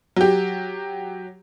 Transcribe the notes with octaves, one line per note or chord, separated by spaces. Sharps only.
F#3 G4